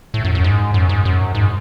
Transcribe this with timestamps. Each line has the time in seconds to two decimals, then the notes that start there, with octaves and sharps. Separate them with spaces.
0.14 A2
0.24 F#2
0.35 F#2
0.44 G#2
0.74 F#2
0.89 G#2
1.05 F#2
1.35 G#2